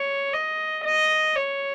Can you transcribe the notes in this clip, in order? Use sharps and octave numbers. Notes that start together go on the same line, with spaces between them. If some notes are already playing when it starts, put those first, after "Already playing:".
Already playing: C#5
D#5
D#5
C#5